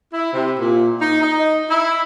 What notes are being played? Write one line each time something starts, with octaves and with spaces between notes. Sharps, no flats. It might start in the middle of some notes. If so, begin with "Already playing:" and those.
E4
C3
A#2
D#4
D#4
E4